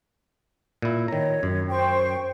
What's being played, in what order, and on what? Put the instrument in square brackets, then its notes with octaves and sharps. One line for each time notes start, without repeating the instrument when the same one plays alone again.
[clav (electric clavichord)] A#2 E4
[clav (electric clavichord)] D#3 A#5 [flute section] C#5
[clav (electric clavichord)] F#2
[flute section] C5 G5 C#6